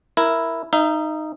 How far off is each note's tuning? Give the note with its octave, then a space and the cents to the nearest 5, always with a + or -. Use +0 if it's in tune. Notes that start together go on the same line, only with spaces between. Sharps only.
E4 +0 A#4 +0
D#4 -5 E5 +35